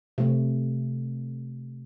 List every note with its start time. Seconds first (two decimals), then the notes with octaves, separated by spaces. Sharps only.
0.18 C3 A3